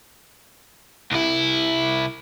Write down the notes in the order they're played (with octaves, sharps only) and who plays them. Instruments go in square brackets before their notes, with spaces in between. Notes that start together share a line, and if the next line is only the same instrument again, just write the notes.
[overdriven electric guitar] C2 E4